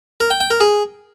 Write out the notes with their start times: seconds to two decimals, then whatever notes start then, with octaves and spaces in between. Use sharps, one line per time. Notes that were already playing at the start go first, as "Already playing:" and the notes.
0.20 A#4
0.30 G5
0.40 G5
0.50 A#4
0.61 G#4